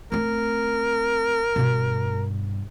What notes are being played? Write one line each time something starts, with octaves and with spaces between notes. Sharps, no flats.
A3 C4 A#4
G2 B2